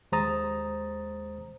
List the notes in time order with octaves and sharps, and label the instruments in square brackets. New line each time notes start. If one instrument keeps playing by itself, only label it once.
[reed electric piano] D#2 G#3 C5 A#5 D#6 A6